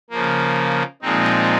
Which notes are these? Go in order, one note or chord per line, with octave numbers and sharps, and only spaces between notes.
C#3 F3 A#3
A#2 F3 G#3 C4 D#4